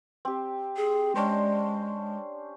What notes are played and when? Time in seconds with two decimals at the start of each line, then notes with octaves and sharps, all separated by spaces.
0.25 C4 G4
0.77 G#4
1.15 G#3 C#4 D4 C5